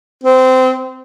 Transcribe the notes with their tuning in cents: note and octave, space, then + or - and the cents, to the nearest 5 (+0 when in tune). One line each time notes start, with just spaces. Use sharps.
C4 -20